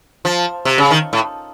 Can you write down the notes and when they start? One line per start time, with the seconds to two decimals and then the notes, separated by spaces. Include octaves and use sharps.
0.25 F3
0.65 C3
0.78 C#3
0.91 D#3
1.13 A2